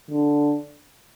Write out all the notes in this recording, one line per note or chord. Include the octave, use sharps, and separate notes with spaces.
D3